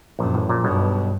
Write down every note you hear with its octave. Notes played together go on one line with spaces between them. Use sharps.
A#1 F#2 A#2
A1 A2
A#1 A#2
B1 G2 B2